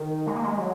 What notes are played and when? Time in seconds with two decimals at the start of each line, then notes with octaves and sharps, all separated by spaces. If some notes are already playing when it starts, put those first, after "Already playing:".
Already playing: D#3
0.27 G#3
0.35 A#3
0.44 G#3
0.58 F#3